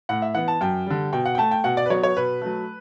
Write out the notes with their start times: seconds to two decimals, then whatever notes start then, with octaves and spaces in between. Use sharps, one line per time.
0.09 A2 F#5
0.22 E5
0.34 E3 B3 F#5
0.48 A5
0.61 F#2 G5
0.86 D3 G3
1.13 B2 G5
1.25 F#5
1.35 G5
1.38 A3 A5
1.51 G5
1.64 B2 F#5
1.77 D5
1.86 B4
1.90 F#3 B3 C#5
2.03 C#5
2.16 B2 B4
2.42 F#3 A3